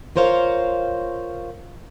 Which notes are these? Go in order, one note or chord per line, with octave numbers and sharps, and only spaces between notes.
F4 A#4 C5 C#5 F5